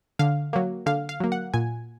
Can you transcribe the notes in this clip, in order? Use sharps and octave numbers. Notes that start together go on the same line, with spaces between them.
D3 F5
F#3 A#3
D3 F5
F5
F#3 A#3
F#5
A#2 G#5